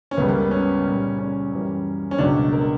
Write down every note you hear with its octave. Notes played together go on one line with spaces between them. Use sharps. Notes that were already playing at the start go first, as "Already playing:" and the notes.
C#4
C#2 C#3 G3 B3
A#3
B3
C#4
A#2 G3
C#4
F#2 E3 G3
C#4
C#2 B2 F#3 D4
A#4